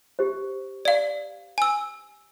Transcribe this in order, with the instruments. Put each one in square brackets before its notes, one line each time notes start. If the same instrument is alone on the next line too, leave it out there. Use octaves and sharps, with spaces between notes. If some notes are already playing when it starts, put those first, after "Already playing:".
[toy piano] G4 C5
[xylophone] D5 F5
G#5 E6